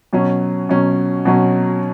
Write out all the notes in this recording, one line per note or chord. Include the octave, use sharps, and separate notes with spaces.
B2 F#3 C#4
B2 F#3 C#4
B2 F#3 C#4